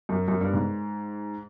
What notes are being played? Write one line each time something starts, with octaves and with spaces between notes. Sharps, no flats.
F#2
F#2
G2
G#2